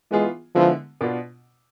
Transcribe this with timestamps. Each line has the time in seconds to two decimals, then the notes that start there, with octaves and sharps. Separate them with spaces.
0.11 E3 G#3 B3 F4 G#4
0.55 D3 F3 G#3 B3 E4
1.01 B2 B3 D4 F4